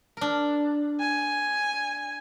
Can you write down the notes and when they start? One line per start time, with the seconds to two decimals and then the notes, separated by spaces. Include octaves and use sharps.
0.17 D4 A#4
1.00 G#5